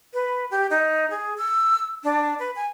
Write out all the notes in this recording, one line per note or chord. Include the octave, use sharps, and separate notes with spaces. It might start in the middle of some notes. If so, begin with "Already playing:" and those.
B4
G4
D#4
G#4
E6
D4
B4
G#5